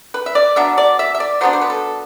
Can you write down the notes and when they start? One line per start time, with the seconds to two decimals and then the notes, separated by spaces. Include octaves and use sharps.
0.14 B4
0.26 E5
0.35 D5
0.56 F#3 B3 D4 E5
0.78 D5
0.99 E5
1.15 E5
1.20 D5
1.41 F#3 B3 D4 C5
1.53 C5
1.61 B4
1.70 A4